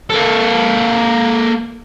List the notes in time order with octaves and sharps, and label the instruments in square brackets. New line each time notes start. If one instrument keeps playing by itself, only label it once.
[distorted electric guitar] A#3 A4